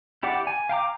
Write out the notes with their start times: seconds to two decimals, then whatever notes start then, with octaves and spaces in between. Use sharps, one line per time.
0.23 E4 G4 D5 F#5 D6
0.47 G#5
0.69 F5 G5 A#5 D6